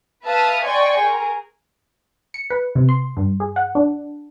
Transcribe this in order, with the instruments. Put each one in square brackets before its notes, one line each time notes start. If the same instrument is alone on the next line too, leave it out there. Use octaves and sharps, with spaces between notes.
[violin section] B4 E5 F5 A5 D#6 F6
D5 D#5 G5 G#5 C6 C#6
G#4 A#4
[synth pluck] C#7
B4
C3
C6
G2
G#4
F#5
D4